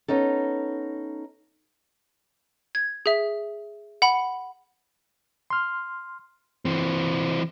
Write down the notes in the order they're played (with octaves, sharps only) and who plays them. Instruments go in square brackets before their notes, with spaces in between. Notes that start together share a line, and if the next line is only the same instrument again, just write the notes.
[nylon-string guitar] B3 C#4 D#4 A4
[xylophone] G#6
G#4 E5
F#5 B5
[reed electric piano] C6 F6
[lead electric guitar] E3 C4